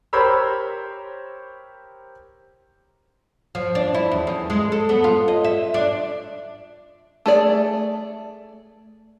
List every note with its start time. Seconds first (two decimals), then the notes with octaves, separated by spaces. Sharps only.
0.13 G4 A#4 C5 C#5 B5 E6
3.55 F3
3.75 D4
3.94 E4
4.12 E2
4.27 E2
4.50 G#3
4.72 A4
4.89 B3
5.04 F4
5.28 D#5
5.45 E5
5.74 D4
7.26 A3 G#4 D5